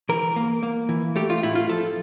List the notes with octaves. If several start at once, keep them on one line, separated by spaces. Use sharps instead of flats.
E3 A#4
A#3
A#3
E3
A3 G4
F4
A2 E4
F4
F3 A4